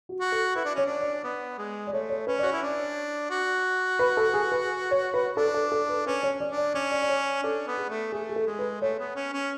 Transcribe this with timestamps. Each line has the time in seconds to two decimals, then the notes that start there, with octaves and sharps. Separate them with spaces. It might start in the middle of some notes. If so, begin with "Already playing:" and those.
0.09 F#4
0.20 F#4
0.32 A4
0.55 E4 B4
0.65 D4
0.75 C#4 C#5
0.85 D4
1.01 D5
1.24 B3
1.58 G#3
1.87 D5
1.93 A3 C#5
2.09 C#5
2.27 C#4 B4
2.39 D5
2.42 F#4 C#5
2.52 E4
2.62 D4
3.30 F#4
3.99 B4
4.17 A4
4.33 G#4
4.52 B4
4.91 C#5
5.14 B4
5.37 D4 A4
5.54 A4
5.72 A4
5.89 B4
6.06 C#4 B4
6.23 C#5
6.40 D5
6.51 D4
6.57 D5
6.74 C#4 D5
6.92 D5
7.02 D5
7.09 C#5
7.43 D4 A4
7.67 B3
7.78 G#4
7.89 A3
8.12 A3 G#4
8.29 G#4
8.36 A4
8.46 G#3
8.59 B4
8.81 A3 C#5
8.99 B3
9.15 C#4
9.33 C#4